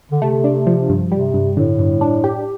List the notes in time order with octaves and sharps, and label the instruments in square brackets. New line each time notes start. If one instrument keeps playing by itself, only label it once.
[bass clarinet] D3
[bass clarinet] C3 [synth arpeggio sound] A3
[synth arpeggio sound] D4
F3
G2
[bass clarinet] C3 [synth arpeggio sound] G3
[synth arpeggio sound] G2
[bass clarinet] A2 [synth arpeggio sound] D3
[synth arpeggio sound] G2
D4
G4